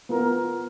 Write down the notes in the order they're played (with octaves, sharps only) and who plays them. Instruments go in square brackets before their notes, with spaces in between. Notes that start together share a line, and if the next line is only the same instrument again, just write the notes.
[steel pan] B3 F4 A#4